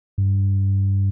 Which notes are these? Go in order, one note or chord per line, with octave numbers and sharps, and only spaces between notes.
G2